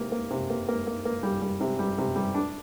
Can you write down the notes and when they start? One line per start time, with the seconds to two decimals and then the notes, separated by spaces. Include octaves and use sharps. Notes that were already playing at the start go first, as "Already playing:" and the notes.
Already playing: C3 A#3
0.12 A#3
0.30 C3
0.50 A#3
0.68 A#3
0.87 A#3
1.05 A#3
1.23 G3
1.42 G3
1.60 C3
1.79 G3
1.98 C3
2.16 G3
2.34 D4